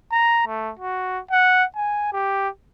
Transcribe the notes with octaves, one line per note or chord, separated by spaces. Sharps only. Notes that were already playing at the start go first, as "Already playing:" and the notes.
A#5
A3
F#4
F#5
G#5
G4